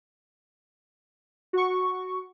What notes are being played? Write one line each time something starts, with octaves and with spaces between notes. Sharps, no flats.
F#4 C#6